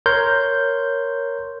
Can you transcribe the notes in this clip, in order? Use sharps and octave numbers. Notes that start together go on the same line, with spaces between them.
A#4 C#5 C6 G6